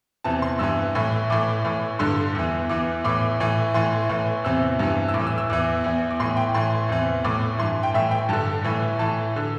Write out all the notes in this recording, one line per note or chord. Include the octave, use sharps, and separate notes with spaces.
E2 C3 E3 A5
C6
G2 E3 E6
A2 E3
A2 E3 D6
A2 E3
G2 D3 C6
E2 E3
E2 E3 D6
A2 E3 D6
A2 E3
A2 E3 C6
A2 E3
E2 C3 E3 E6
G2 E3
E6
A2 D6
E3
E6
E6
E2 E3 D6
E2 E3
D6
A2 E3 C6
G5
A2 E3 C6
E2 C3 E3
A2 E3 D6
G2 E3 C6
G5
A2 E3 E5
G5
G2 D3 A5
A2 E3
A2 E3 A5
D3